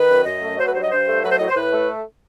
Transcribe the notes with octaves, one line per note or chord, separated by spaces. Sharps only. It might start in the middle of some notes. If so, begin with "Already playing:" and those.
Already playing: D#3 B4
F#2
F#2 D#5
A3
F#3 C5
B4
G2 C5
D#5
G2 C5
A3
F#3 B4
C5
A2 D#5
C5
A2 B4
A3